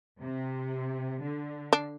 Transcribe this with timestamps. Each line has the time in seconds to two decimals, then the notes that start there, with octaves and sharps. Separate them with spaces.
0.20 C3
1.22 D3
1.73 D4